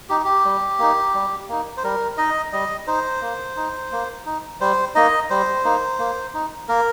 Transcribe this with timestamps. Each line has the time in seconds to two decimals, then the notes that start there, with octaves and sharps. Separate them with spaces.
0.09 D#4 G4
0.24 G4
0.45 G3
0.79 A#3 D#4
1.14 G3
1.49 A#3 D#4
1.77 C5
1.84 G3 A#4
2.18 D#4 D#5
2.52 G3 D#5
2.87 D#4 C5
3.22 A#3
3.56 D#4
3.92 A#3
4.26 D#4
4.61 G3 C5
4.95 A#3 D#4 D#5
5.30 G3 C5
5.64 A#3 D#4
5.99 A#3
6.34 D#4
6.68 A#3 A#4